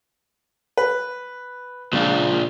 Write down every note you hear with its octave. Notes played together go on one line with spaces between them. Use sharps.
B4
C#2 A#2 D4